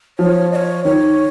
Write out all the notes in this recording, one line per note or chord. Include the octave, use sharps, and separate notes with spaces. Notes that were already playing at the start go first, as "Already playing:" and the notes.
F3 C#5
D#5
C#5
D#3 C#5